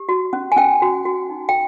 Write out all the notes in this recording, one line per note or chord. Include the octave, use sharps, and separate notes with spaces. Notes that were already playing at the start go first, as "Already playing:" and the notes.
Already playing: G4
F#4
C#4
G#5
C#4 G5
F#4
F#4
D#4
G5